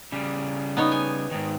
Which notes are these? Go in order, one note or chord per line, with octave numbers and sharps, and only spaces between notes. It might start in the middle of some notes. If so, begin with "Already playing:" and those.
C#3 G3
B3 D#4 C#5
G#5
G#2 D#3